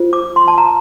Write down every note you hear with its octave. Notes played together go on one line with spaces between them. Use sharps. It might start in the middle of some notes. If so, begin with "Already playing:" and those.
Already playing: F4 C5
D6
C6
A5
A#5